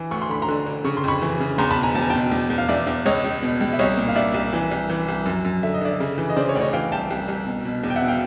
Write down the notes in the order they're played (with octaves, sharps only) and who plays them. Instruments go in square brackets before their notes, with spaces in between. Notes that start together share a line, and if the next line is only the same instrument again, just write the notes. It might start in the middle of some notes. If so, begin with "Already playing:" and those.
Already playing: [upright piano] E3
D2 C#6
C6
D3 B5
A#5 C6
D3
D3
C#3 C#6
C6
F2 B5 C#6
E3
C#3
E2 A#5 C6
A5 B5
B2
G#5 A#5
E2 A5
G#5
B2 G5 A5
E2
E2
F5
E2 D5 E5
E2
C#2 C#5 D#5
C#2
B2
C#2
E5
C2 C#5 D#5
A#2
F5
C2 D5 E5
C2
E3
C2
E3
C2
F#2
F#2
D3 E5
D#5
D3 D5 E5
C#3
E3
D#5
C#3 C5 D5
C#5
D2 D5
C#5 D#5
E3 F5 G5
C2 G5 A5
C2
C2
B2
B2
E2
G5
E5 F#5
B2
F5 G5